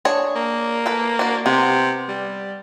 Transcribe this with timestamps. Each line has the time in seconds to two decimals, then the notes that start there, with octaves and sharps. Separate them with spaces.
0.05 D4 G#4 C#5
0.36 A#3
0.86 A4 B4
1.19 D4 F#4
1.46 C3 B3
2.09 G3